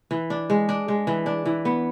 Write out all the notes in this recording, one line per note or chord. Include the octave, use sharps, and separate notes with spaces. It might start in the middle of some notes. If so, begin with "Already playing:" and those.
E3
D4
G#3
D4
G#3
E3
D4
E3
B3